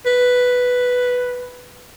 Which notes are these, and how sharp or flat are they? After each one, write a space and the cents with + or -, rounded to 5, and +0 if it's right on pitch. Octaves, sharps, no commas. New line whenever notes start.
B4 +0